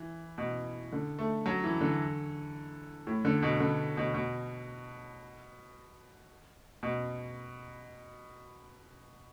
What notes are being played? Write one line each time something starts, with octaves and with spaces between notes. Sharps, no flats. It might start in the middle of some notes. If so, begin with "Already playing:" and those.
Already playing: E3
B2
D3
A3
F#3
E3
D3
A2
D3
B2
D3
B2
B2
B2